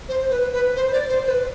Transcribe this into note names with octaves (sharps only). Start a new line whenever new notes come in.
C5
B4
B4
C5
D5
C5
B4